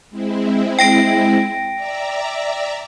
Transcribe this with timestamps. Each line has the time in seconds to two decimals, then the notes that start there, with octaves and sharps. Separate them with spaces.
0.10 G#3 C4 E4
0.79 G5 A#6 D7
1.75 D5 E5 A#5